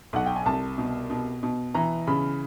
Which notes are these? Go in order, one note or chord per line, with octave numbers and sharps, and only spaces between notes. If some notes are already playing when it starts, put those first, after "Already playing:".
B1 F#5
G5
G#5
C2 A5
B2
B2
B2
E3 A#5
C#3 B5